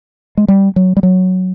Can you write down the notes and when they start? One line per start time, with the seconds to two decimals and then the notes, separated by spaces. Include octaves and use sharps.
0.37 G#3
0.48 G3
0.76 F#3
0.97 G3
1.03 F#3